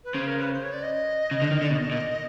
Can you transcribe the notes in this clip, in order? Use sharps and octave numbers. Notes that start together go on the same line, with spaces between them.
B4
C#3 C5
A#4
B4
C5
C#5
D5
D#5
C#3
D3
D#3
D3
D5
B2 D#5
A#2